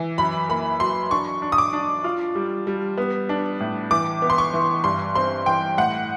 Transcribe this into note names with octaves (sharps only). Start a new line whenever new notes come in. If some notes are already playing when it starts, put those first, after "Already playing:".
Already playing: E3
F#2 B5
A#3 B5
F#3 C6
D4 C#6
D4
D#6
D6
D4
F4
G3
G3
B3
D4
A2
E3 D6
B3
C6
C#6
E3
G2 C6
C4 C6
E3 G5
A2 F#5